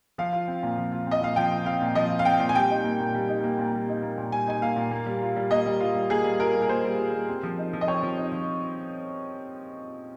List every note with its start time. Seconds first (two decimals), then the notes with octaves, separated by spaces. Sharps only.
0.18 F3 F5
0.33 F4
0.48 C4
0.63 A#2
0.78 F3
0.92 F4
1.07 C4 D#5
1.21 A#2 F5
1.36 F3 G5
1.51 F4
1.66 C4 F5
1.81 A#2
1.95 F3 D#5
2.10 F4
2.19 F5
2.25 C4 G5
2.40 A#2
2.49 G#5
2.55 G3 G5
2.70 D#4
2.84 A#3
3.00 A#2
3.15 G3
3.28 D#4
3.44 A#3
3.58 A#2
3.73 G3
3.89 D#4
4.03 A#3
4.18 A#2
4.32 G3 G#5
4.47 D#4 G#5
4.62 A#3 F5
4.76 A#2
4.91 A#3
5.06 G3
5.22 F4
5.36 G3
5.51 A#3 D#5
5.66 G3
5.80 F4
5.95 G3
6.10 A#3 G#4
6.24 G3
6.40 F4 A#4
6.54 G3
6.62 A#4
6.69 A#3 C5
6.84 G3
6.98 F4
7.13 G3
7.29 C4
7.43 F3
7.58 D#4
7.73 F3
7.81 D#5
7.87 C4 C#5
8.03 F3
8.17 D#4
8.32 F3